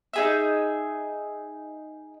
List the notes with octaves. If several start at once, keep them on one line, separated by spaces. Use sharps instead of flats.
D#4 G#4 E5